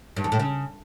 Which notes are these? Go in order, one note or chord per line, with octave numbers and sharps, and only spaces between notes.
G2
E2
A2
C#3